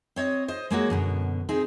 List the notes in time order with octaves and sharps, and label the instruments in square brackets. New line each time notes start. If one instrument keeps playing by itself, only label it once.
[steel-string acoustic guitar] C4 C#5 D#5
C5 D#5
G#3 A#3 F#4 C#5
F#2 B2 D3
C4 D#4 G#4